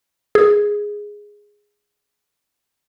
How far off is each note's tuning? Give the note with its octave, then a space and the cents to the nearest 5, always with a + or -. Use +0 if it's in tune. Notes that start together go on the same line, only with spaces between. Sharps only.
G#4 -5